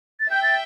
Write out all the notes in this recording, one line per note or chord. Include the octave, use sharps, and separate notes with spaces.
A6
E5 G5 G6
A6